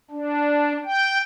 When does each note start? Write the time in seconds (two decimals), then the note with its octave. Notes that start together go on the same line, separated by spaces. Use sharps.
0.11 D4
0.85 G5